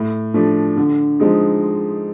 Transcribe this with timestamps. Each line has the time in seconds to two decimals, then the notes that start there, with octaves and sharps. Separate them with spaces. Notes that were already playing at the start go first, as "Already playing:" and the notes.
Already playing: A2
0.34 F3 A3 D4
0.77 D3
1.19 F3 G#3 C4 D#4